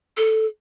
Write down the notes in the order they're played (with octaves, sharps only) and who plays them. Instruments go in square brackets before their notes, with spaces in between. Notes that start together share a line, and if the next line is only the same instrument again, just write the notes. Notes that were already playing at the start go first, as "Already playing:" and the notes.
[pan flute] A4